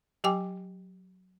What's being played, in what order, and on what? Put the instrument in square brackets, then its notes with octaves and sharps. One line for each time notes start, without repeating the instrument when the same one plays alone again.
[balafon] F#3 G4 G5 G#5 D6